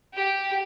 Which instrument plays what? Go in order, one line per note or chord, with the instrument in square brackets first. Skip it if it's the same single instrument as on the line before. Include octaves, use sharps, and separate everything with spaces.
[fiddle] G4